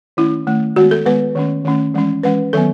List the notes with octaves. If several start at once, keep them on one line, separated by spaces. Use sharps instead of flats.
D#3 A3 C#4 E4
D#3 A3 C#4
D#3 G#3 B3 F#4
A4
D#3 G#3 B3 B4
D#3 A3 C#4
D#3 A3 C#4
E3 G#3 C#4
E3 G#3 C#4 B4
D#3 F#3 B3 A4